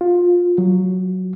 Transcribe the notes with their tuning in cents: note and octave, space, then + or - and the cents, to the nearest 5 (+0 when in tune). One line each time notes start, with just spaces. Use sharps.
F4 +15
F#3 +0